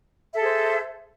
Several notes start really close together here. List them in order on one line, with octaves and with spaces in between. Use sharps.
E5 A4 G#4 C5